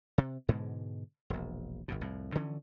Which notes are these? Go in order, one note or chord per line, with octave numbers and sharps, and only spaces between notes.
C3
G#2 B2 D3 G#3
E1 A#1
G#1 F2 B2
C2 F2 A2
D3 E3 F3 C#4